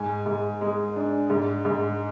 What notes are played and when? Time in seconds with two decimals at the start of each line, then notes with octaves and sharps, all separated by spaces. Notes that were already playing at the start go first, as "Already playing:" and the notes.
Already playing: G#2 G#5
0.26 G#2
0.61 G#3
0.96 D4
1.30 G#2
1.65 G#2